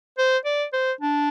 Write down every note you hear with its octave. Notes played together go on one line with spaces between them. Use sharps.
C5
D5
C5
D4